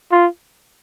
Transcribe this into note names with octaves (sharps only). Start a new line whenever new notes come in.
F4